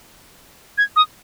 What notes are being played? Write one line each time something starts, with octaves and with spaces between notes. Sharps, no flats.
G#6
D#6